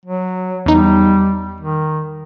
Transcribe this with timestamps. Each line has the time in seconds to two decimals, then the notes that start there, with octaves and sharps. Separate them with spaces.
0.05 F#3
0.66 E2 G3 D#4
1.61 D#3